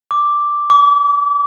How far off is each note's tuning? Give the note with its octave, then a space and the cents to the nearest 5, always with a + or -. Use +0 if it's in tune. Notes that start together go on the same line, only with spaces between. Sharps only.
D6 +0
D6 -35